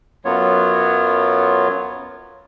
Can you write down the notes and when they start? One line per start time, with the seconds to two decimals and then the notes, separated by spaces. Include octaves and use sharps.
0.25 F#2 F#3 B3 F4 C#5